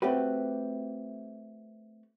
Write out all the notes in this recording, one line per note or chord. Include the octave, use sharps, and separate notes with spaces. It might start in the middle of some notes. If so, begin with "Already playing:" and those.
A3 C4 F#4 G4 B4